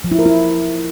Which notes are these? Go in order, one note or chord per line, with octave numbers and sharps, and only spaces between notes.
F3
E4
A#4
E4